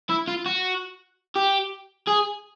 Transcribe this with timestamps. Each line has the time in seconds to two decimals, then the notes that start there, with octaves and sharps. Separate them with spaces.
0.10 E4
0.28 F4
0.46 F#4
1.36 G4
2.07 G#4